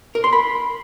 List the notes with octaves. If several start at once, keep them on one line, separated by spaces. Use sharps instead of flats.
A#4
C6
B5